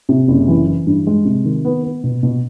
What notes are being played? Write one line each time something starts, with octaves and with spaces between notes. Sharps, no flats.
C3
F#1
E3
E3
G2
G#3
C3
D#3
B3
B3
B2
B2